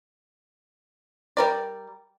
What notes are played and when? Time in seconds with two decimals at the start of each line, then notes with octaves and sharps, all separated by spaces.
1.37 G3 A#4 D5